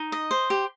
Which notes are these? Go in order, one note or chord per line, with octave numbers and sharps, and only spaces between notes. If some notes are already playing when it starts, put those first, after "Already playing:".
Already playing: D#4
D#5
C5
G4